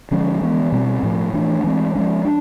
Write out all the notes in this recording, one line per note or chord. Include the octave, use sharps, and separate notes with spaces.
D3 F3 G#3 C#4
E3 G#3 B3
B2 G3 C4
A2 F3 A3
E3 A3 D4
E3 G#3 C4
F3 G#3 C#4
D4